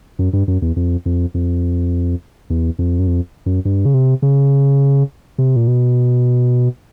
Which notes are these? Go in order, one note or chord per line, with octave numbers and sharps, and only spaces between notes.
F#2
G2
F#2
E2
F2
F2
F2
E2
F2
F#2
F2
F#2
G2
C#3
C3
C#3
C3
A#2
B2